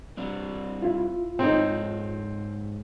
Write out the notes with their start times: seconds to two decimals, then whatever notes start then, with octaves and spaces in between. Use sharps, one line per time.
0.17 G3 C4 D4
0.82 E4 F4
1.39 G#2 C4 D#4 C#5